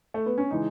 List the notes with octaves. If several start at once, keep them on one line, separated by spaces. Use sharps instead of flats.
A3
B3
C#4
C#3 E3 G#3 D#4